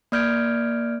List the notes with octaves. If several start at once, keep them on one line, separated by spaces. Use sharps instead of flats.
A#3 D5 F6 G6 G#6 D7